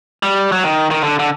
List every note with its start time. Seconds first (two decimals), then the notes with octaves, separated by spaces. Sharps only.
0.23 G3
0.52 F#3
0.64 D#3
0.91 D#3
1.03 D3
1.19 D3